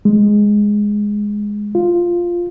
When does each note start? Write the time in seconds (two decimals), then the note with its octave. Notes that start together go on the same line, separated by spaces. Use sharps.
0.05 G#3
1.75 F4